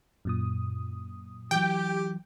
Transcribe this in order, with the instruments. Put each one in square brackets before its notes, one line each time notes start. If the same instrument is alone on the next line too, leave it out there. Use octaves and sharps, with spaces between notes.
[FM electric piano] F#2 A#2 D#6
[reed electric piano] E3 F#3 [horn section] G4 [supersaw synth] G5